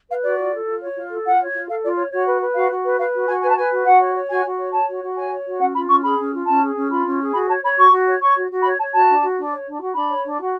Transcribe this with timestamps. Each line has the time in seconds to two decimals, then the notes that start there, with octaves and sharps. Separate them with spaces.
0.09 B4 F5
0.23 F#4 D5
0.38 F4
0.52 A4
0.66 F4
0.81 C#5
0.96 F4
1.10 A4
1.25 F4 F#5
1.40 C#5
1.53 F4
1.68 A4 F5
1.82 F4 D5
1.97 C#5
2.12 F#4 C#5
2.27 B4
2.40 B4
2.55 F#4 F5
2.70 F#4
2.84 B4
2.98 B4 F5
3.13 F#4
3.28 F#4 G#5
3.42 B4 G#5
3.49 A5
3.57 B4 G#5
3.71 F#4
3.85 F#4 F#5
4.00 C#5
4.15 C#5
4.29 F#4 G#5
4.44 F#4
4.58 C#5
4.72 C#5 A5
4.87 F#4
5.01 F#4
5.17 C#5 G#5
5.31 C#5
5.45 F#4
5.60 C#4 F#5
5.74 F4 B5
5.88 C#4 C#6
6.03 G#4 B5
6.18 C#4
6.32 F4
6.46 C#4 A5
6.61 G#4
6.75 C#4
6.90 F4 B5
7.05 C#4
7.19 G#4
7.33 F#4 B5
7.48 C#5 A5
7.62 C#5 B5
7.77 F#4 C#6
7.91 F#4
8.06 C#5
8.21 C#5 C#6
8.36 F#4
8.50 F#4
8.64 C#5 B5
8.79 C#5 A5
8.93 F#4 A5
9.08 D4
9.22 F#4
9.37 D4
9.52 C#5
9.66 D4
9.80 F#4
9.95 D4 B5
10.09 C#5
10.24 D4
10.38 F#4